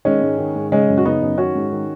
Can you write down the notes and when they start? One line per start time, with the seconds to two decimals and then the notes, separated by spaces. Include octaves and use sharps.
0.05 D#3 G#3 C#4
0.22 G#2
0.38 D#3
0.55 G#2
0.72 C#3 G#3 C#4
0.89 F#2
0.98 F#4
1.05 C#3 B3 D#4
1.22 F#2
1.38 D#3 C#4 F#4
1.55 G#2
1.72 D#3